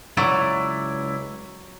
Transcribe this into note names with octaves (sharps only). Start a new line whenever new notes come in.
C#2 F#3 E4 D5